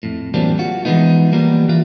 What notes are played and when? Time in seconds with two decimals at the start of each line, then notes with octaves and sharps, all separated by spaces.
0.03 F2 A2
0.34 E3 F#3 G3 A#3 C4 D4
0.59 F4 F#4
0.85 E3 F3 G#3 B3 D#4
1.32 E3 F3 G3 A#3 B3
1.69 E3 F4